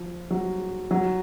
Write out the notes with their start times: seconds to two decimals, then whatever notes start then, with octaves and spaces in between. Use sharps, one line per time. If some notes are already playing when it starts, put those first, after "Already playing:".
Already playing: F3
0.30 F#3
0.91 F#3